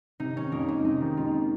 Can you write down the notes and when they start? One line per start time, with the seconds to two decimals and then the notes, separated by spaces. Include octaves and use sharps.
0.20 C3 D#4
0.36 D#3 C#4
0.52 F2 A#3
0.68 F2 G#3
0.85 C3 D#4
1.01 D#3
1.17 F2 F4